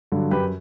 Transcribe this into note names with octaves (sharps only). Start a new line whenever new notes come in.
G2 D3 F#3
F#2 G4 B4